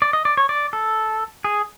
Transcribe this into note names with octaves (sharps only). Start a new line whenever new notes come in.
D5
D#5
D5
C#5
D5
A4
G#4